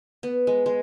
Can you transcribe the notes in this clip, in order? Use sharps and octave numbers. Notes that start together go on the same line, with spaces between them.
B3
G#3
G#3